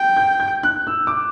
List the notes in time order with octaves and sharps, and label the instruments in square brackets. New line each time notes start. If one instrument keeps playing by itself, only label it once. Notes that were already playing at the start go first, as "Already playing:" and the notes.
Already playing: [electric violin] G5
[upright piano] G6
G6
F#6
E6
D6